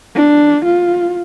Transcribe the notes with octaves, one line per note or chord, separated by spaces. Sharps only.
D4
F4